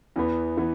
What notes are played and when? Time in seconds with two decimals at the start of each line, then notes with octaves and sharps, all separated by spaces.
0.16 E2 E3 B3
0.57 E3 B3